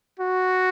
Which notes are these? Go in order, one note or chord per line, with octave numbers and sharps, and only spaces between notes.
F#4